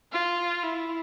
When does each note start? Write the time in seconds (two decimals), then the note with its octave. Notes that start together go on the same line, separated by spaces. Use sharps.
0.12 F4
0.63 E4